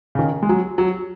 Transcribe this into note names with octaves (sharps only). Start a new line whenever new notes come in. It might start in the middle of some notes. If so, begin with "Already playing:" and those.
C#3
D#3
G#3
F#3
F#3